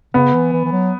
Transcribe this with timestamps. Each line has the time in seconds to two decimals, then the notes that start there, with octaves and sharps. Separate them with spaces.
0.14 C#3 B3
0.34 E3
0.53 E3
0.64 E3
0.72 F#3